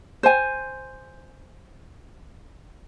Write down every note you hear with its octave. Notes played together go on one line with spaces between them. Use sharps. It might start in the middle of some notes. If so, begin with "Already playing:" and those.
C5 G#5